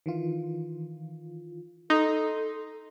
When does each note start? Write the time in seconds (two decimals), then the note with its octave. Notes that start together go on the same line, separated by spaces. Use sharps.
0.06 D#3 E3 F4
1.90 D#4 A4 C6